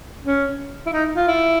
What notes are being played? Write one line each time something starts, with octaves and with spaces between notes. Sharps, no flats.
C#4
E4
D#4
F4
E4